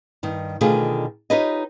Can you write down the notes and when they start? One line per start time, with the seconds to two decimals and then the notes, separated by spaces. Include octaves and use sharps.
0.23 G2 D#3
0.61 B2 D3 D#3 A3 F4 G#4
1.30 D#4 F4 G4 B4 C#5 D#5